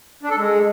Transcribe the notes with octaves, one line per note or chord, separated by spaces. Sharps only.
D4
A4
G#3